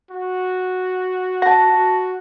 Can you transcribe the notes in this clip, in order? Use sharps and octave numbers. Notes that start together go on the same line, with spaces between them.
F#4
F#5 A5 A#6
F#4